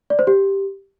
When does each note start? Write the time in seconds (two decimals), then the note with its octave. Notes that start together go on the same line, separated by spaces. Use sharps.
0.10 D5
0.19 C5
0.27 G4